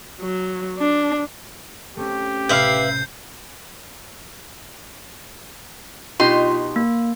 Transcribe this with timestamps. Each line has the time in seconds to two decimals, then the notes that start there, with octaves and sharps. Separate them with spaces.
0.19 F#3
0.78 D4
1.97 A3 C4 C#4 G4
2.49 A1 C3 B4 E5 F5 G6 C7
6.20 B2 D#4 F4 G4 C6
6.76 A#3